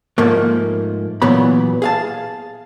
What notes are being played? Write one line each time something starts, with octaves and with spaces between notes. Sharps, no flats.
G#2 F3 A3 A#3
A#2 E3 F#3 B3 B5
G#4 F5 A5